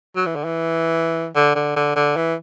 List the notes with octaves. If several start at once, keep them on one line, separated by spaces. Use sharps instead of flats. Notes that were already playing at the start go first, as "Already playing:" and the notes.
F#3
E3
D3
E3
D3
D3
D3
D3
E3